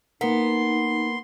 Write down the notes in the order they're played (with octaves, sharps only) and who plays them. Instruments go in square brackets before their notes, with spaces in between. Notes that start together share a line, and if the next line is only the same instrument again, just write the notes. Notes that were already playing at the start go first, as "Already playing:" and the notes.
[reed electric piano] A#3 A#4 [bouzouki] B3 [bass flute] D#4 [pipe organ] C6